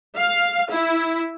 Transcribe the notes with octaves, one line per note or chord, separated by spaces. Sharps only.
F5
E4